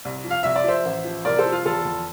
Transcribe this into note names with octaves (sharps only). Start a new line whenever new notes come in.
C2
F3
F5
C2 E5
D5
F3 C5 E5
A1
F3
C2 A#4 D5
A4 C5
F3
F4
E2 F4 A4
E2